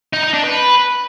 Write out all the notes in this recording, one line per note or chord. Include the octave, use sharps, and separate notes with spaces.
D#4
D#4
D4
B4